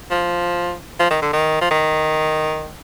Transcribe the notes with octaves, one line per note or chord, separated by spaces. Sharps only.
F3
F3
D#3
D3
D#3
F3
D#3